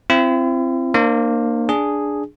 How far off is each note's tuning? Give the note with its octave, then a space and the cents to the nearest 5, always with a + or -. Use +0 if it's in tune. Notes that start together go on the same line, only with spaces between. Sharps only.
C4 +0 E4 +45
A#3 +0 D4 +40 C5 +25
D4 +0 G#4 +0